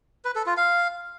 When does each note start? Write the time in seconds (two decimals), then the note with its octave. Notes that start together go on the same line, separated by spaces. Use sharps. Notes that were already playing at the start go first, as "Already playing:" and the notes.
0.25 B4
0.35 A4
0.46 F4
0.57 F5